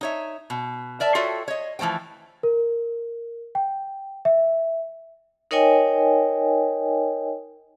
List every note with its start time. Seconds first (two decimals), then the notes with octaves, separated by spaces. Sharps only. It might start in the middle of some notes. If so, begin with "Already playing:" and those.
0.01 D#4 C#5 E5
0.50 B2
1.00 A#4 D5 E5 A5
1.15 F4 F#4 A4 C#5 E5 G5
1.48 C#5 D#5
1.79 E3 F3 A3 C5 G5
2.43 A#4
3.55 G5
4.25 E5
5.51 D#4 A#4 C#5 D#5 G5 G#5